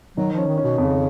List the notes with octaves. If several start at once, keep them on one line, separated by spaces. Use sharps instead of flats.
D#3 F#3
F3
C#4
D#3
C#4
B2
F2 C#3